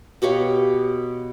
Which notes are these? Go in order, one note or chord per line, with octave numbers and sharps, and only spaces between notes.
B2 G4 C#5 F5